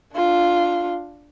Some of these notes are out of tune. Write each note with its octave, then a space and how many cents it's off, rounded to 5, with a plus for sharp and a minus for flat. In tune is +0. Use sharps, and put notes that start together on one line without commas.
D4 +0 F4 +0